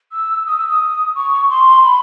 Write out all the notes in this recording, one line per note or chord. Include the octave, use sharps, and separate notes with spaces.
E6
D#6
E6
D#6
C#6
C6
B5